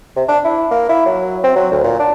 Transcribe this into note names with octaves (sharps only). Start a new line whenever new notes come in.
C3
D4
E4
A#3
E4
F#3
C4
F#3
D2
A#2
D4